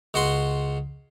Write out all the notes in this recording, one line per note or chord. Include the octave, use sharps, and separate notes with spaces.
C#2 F#4 F#5 C6